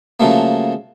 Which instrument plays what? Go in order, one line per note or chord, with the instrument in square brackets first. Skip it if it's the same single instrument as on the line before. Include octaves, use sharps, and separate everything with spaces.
[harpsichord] C#3 F3 F#3 A3 A#3